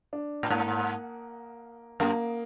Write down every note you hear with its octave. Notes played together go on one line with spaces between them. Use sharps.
D4
A2
G#2 A#3
F#2 A#3